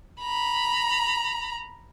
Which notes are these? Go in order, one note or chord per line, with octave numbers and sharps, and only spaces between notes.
A#5 B5